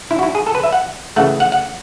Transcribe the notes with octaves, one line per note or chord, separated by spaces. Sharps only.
E4
F#4
E4
G#4
A4
B4
E5
F#5
C#3 E3 A3 F#5
F#5
F#5